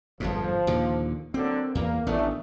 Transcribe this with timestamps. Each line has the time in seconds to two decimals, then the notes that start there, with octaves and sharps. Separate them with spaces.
0.20 G1 F2 G#2 F3
0.67 D#2 A#2 D3
1.34 D3 F#3 A#3 C4
1.75 E2 E3 A#3
2.07 A1 D#3 A3 B3 D4